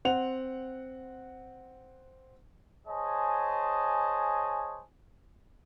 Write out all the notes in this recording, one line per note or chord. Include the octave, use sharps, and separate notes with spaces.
C4 F#5 F7
G#4 C5 C#5 D#5 G#5 A5